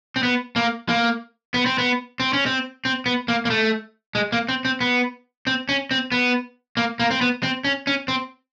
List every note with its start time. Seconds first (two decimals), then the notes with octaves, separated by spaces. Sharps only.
0.16 C4
0.23 B3
0.56 A#3
0.89 A#3
1.54 B3
1.66 C4
1.78 B3
2.20 C4
2.33 C#4
2.46 C4
2.85 C4
3.06 B3
3.28 A#3
3.45 A#3
3.50 A3
4.15 G#3
4.32 A#3
4.48 C4
4.65 C4
4.81 B3
5.47 C4
5.69 C#4
5.91 C4
6.12 B3
6.77 A#3
7.00 A#3
7.11 C4
7.21 B3
7.43 C4
7.64 C#4
7.87 C#4
8.08 C4